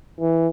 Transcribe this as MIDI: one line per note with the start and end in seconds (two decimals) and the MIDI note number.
0.20 0.48 52